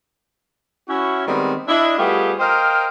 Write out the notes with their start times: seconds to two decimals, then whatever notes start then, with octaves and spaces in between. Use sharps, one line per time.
0.88 C#4 E4 F#4
1.27 D#3 G3 G#3 B3 C4
1.68 D4 E4 D#5
1.97 G3 A3 B3 F4 G4 G#4
2.39 A#4 C5 D#5 F5 G5